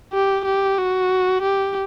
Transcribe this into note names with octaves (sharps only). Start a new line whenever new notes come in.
G4
G4
F#4
G4